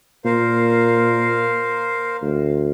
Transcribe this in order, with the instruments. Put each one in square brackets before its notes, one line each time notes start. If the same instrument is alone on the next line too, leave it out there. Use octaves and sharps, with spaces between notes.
[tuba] A#2 [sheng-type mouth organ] A#4 C5 F5
[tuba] D2